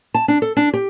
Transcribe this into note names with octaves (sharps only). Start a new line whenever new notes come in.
A5
D4
A4
D4
G4